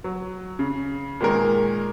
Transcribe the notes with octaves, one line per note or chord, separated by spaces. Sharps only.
F#3
C#3
A#2 D#3 G#3 A#4